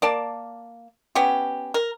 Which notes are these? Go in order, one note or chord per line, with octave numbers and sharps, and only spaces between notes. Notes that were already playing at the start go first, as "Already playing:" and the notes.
A#3 D5 A5
B3 C#4 G4
A#4